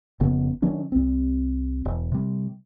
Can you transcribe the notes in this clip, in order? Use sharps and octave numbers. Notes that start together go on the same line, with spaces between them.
F1 C#3 B3
D#3 F#3 C#4 D4
C2 C4
E1
C3 G3